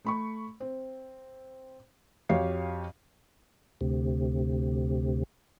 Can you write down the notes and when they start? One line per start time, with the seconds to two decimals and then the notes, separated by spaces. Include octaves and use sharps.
0.05 A3 B5 C#6
0.60 C4
2.29 F2 F#4 G4 C#5 F5 C7
3.81 D2 C3